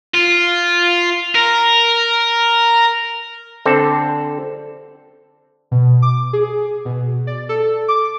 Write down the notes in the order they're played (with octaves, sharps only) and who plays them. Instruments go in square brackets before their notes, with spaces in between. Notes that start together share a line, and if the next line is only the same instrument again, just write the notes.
[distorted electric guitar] F4
A#4
[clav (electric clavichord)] D3 C4 A4
[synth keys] B2
D6
G#4
B2
D5
A4
D6